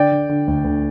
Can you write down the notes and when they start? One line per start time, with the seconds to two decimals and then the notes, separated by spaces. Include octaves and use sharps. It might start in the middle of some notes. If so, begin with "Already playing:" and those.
Already playing: D3 D5 G5
0.12 D3
0.29 D3
0.47 D2
0.64 D2